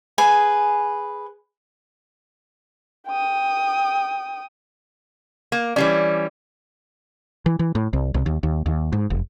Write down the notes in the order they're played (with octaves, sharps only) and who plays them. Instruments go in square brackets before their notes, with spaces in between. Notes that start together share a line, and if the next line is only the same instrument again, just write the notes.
[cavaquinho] G#4 B4 G#5
[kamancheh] G5 D#6
[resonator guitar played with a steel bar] A#3
[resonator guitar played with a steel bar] E3 G3 C#4 [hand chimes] D5
[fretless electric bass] E3
E3
A2
C2
C2
D#2
D#2
D#2
G#2
F1